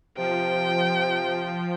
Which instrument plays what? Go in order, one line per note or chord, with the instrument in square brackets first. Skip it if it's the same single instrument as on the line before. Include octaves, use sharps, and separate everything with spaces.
[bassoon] C3 [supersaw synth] F3 [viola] G5